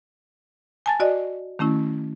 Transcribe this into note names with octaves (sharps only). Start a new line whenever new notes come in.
G#5 A5 A6
F#4 D5 D#5
D#3 A3 C#4 E4